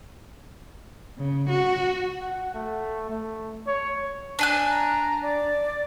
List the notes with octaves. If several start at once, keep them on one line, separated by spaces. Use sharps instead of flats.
C#3
F#4
F#5
A3
A3
C#5
D4 G#5 F#6
A#5
D5